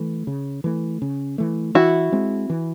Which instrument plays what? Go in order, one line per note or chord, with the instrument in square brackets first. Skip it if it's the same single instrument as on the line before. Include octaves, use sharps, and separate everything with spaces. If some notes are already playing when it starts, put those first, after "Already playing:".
Already playing: [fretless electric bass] E3 A3
C#3
E3 A3
C#3
E3 A3
[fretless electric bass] E3 [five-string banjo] E4 F#4
[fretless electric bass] G#3 C4
E3